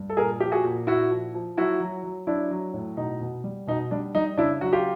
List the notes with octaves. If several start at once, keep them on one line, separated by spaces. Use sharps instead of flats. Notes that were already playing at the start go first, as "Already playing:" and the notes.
Already playing: G2
A4
A#2 G#4 A#4
F3 G4
F#4 G#4
A#2
A#2 E4 F#4
F3
F3
F#3 E4 F#4
F#3
F#3
F#3 D4 E4
F#3
A2
B2 D#4
B2
G3
B2 D#4
G3 D4
G3 D#4
C#3 D4 E4
F#3 F#4
F4 G4